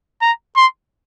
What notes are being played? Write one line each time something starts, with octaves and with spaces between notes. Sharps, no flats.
A#5
C6